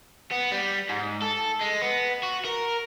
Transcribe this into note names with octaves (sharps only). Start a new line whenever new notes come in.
B3
G3
G#2
A4
G#3
B3
F#4
A#4